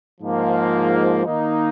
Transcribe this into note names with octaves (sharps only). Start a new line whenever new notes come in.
G#2 F3 A#3
D#3 A#3 D#4